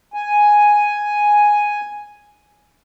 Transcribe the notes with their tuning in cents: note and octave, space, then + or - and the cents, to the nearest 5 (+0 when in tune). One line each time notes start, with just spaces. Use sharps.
G#5 +0